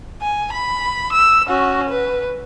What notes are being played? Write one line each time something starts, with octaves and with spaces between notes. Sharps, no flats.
G#5
B5
E6
C#4 F#4
B4